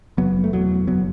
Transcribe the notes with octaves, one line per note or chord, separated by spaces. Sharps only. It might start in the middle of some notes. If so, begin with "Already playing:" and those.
F#1 F#3 B3
A3
E2 B2 F#3
F#1 F#3 B3